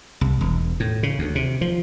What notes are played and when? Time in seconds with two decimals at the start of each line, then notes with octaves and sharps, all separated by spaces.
0.21 C2
0.41 E1
0.80 A2
1.03 C#3
1.19 D2
1.35 C3
1.61 F3